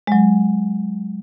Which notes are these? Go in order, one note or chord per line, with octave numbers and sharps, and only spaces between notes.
F#3 G#3